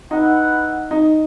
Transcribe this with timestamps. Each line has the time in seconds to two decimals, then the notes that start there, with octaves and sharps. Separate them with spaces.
0.11 D#4 E4 B4 F#5
0.91 D#4